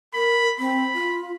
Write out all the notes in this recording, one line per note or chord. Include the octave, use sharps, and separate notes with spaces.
A#4 B5
C4 B5
F4